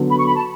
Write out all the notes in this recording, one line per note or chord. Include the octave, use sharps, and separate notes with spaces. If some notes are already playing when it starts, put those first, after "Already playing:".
Already playing: D3 F#3 B3
B5
C#6
B5
A5